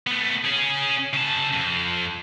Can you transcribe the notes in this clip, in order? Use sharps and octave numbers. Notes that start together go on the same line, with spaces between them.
A3 B3
C#4 G#4
C#3 A5
F2